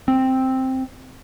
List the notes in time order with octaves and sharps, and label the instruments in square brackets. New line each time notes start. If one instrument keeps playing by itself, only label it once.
[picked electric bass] C4